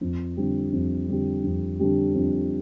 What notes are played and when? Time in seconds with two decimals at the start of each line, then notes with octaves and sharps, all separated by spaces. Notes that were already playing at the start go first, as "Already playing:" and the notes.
0.01 F2
0.37 D3 G3 C4 G4
0.72 F2
1.08 D3 G3 C4 G4
1.44 F2
1.79 D3 G3 C4 G4
2.14 F2